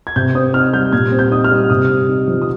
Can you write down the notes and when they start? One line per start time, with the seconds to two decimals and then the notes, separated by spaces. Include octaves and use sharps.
0.07 G#6
0.16 C3 G6
0.35 C4 D#6
0.54 D#4 F6
0.73 G3 G6
0.92 A#2 G#6
1.12 C4
1.19 G6
1.31 D#4 D#6
1.44 F6
1.51 G3
1.70 C3 D#6
1.89 C4
2.08 D#4
2.28 F3
2.42 D#6